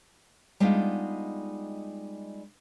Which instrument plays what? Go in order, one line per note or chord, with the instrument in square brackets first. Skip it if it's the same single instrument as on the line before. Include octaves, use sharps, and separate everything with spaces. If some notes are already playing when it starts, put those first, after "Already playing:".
[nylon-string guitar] G3 G#3 B3 D4 D#4 F4